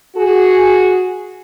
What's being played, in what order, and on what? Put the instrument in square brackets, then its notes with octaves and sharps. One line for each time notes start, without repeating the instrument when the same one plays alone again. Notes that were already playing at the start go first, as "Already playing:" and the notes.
[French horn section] F#4 G#4